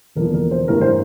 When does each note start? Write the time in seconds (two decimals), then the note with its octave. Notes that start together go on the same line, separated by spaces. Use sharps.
0.15 E1 E2 D3 F3 A#3 A#4
0.34 A#4
0.51 C5
0.68 A1 G2 E3 A#4
0.81 C5